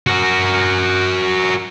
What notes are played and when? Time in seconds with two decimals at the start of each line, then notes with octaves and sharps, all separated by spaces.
0.07 F#4 A#4